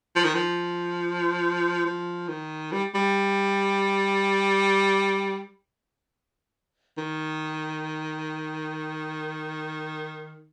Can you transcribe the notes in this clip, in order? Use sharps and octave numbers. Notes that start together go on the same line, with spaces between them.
F3
D#3
F3
F3
D#3
G3
G3
D#3